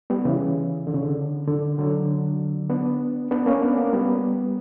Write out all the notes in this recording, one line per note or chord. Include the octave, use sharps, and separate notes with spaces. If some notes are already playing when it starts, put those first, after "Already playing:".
G3 B3
C#3 E3
D3
C#3
D3
D3
D3 F#3
B3 D4
B3 D4
A#3 C#4
B3 D4
A#3 C#4
G3 B3